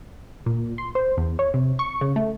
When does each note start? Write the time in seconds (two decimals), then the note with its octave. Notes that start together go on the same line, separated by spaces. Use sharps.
0.46 A#2
0.78 C6
0.95 C5
1.17 E2
1.39 C#5
1.54 C3
1.79 C#6
2.01 C#3
2.16 A3